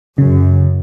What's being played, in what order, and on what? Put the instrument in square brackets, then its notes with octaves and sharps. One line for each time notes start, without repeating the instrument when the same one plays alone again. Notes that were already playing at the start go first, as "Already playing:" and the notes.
[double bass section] F#2 [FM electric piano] C#3